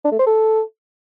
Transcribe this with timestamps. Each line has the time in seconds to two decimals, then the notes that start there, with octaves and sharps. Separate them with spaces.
0.04 D4
0.12 A3
0.19 C5
0.26 A4